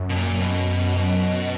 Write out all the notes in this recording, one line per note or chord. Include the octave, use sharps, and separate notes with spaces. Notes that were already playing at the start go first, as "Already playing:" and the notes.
Already playing: F#2
B2
A#2
B2